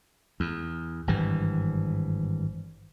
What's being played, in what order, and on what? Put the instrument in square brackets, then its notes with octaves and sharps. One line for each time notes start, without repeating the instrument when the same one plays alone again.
[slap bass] E2
G#1 G2 E3